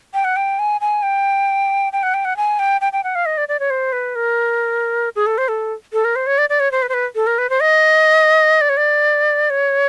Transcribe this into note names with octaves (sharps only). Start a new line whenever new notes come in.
G5
F#5
G5
G#5
G#5
G5
G5
F#5
G5
F#5
G#5
G5
G5
G5
F#5
F5
D#5
D5
D5
C#5
C5
B4
A#4
G#4
A4
C5
A4
A4
A#4
C5
C#5
D5
D5
C#5
C5
B4
C5
B4
A4
A#4
B4
C5
D#5
D5
C#5
D5
C#5